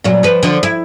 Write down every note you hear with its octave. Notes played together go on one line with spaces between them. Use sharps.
A#2 F#3
F3 B4
D3 F3
E4